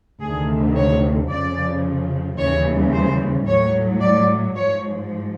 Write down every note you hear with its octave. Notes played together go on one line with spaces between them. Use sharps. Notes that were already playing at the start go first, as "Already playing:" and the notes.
D2 C3 D#3 G#4
C#5
F2 C#3 F3 D5
D#2 C#3 E3 G3 C#5
C5
A2 F#3 C#5
D5
G#2 F3 C#5